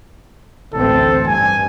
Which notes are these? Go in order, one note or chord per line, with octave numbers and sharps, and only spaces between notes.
A1 D2 C4 A4
G2 G#5